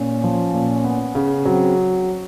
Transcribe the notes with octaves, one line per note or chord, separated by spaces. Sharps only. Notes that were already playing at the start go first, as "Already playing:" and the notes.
Already playing: A#2 C#4
F3
A#2
B3
C#3
F#3 C4